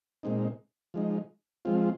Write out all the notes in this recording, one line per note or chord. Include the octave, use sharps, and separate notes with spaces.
A#2 G#3 C4 D#4
F3 G#3 D#4
F3 G#3 C4 F4